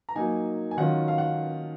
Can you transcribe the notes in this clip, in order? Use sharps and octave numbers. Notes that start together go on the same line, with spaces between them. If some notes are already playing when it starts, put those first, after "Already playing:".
A#5
F#3 A#3 D#4 G#5
G#5
D#3 F#3 C#4 F4 F#5
F5
F#5